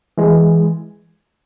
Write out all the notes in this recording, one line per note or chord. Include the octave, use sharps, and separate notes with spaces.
E3 G#3